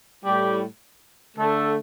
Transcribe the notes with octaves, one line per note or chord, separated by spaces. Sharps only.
A2 G3 G4
D3 A3 A4